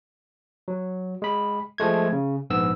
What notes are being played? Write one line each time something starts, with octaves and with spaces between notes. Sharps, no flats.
F#3
G#3 B5
F3 G#3 A3 G#6
C#3
A#1 G#2 B3 E6